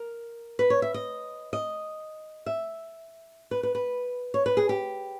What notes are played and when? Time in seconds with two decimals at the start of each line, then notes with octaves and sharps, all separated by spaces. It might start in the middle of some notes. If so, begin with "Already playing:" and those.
Already playing: A#4
0.59 B4
0.70 C#5
0.82 E5
0.94 D#5
1.53 D#5
2.46 E5
3.51 B4
3.63 B4
3.75 B4
4.34 C#5
4.46 B4
4.57 G#4
4.69 G4